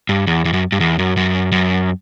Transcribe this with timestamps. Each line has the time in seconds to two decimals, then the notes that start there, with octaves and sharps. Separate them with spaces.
0.09 G2
0.27 E2
0.45 E2
0.53 F#2
0.72 G2
0.80 E2
0.99 F#2
1.17 F#2
1.52 F#2